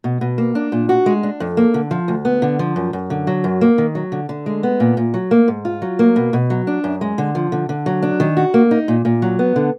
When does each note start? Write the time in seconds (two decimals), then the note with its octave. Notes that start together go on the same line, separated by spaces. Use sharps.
0.04 B2
0.21 B2
0.38 A#3
0.55 D4
0.72 A#2
0.89 F#4
1.06 G#3
1.23 D4
1.40 F2
1.57 A#3
1.74 D3
1.91 F3
2.08 D2
2.25 B3
2.42 D3
2.59 F3
2.76 F#2
2.93 F#2
3.10 D3
3.27 F#3
3.44 F#2
3.61 A#3
3.78 D#3
3.95 F#3
4.12 D3
4.29 D3
4.46 G#3
4.63 B3
4.80 A#2
4.97 A#2
5.14 F#3
5.31 A#3
5.48 G#2
5.65 F4
5.82 F#3
5.99 A#3
6.16 B2
6.33 B2
6.50 F#3
6.67 D4
6.84 F#2
7.01 G#3
7.18 D3
7.35 F3
7.52 D3
7.69 D3
7.86 F#3
8.02 D4
8.20 D#3
8.37 F#4
8.54 A#3
8.71 D#4
8.88 A#2
9.05 A#2
9.22 F#3
9.39 B3
9.56 D3